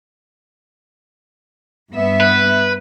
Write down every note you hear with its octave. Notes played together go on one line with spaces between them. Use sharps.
G2 B3 E5
B4